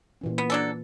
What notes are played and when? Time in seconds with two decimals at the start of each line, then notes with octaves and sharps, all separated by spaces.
0.21 A#2 E3 C#4
0.38 B3
0.50 F#3 D4 A4